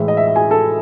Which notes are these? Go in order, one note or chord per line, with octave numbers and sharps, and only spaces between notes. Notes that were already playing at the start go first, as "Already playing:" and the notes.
Already playing: A2 E3 G#3 E5
D#5
E5
E5
G#4 G#5
A4 A5